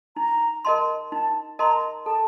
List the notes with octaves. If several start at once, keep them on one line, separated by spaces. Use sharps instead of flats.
D#4 A#5
A#4 D#5 A5 C6
D#4 A5
A#4 D#5 A5 A#5 C6
A4 A5